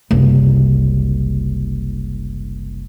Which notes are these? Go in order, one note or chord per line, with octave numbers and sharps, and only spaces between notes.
F#1 C2